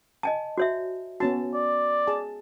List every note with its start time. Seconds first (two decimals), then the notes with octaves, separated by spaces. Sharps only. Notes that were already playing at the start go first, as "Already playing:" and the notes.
0.23 D#5 G#5 A5
0.58 F#4 C#5 E5
1.20 B3 C#4 F#4 A5
1.54 D5
2.07 G#4 A5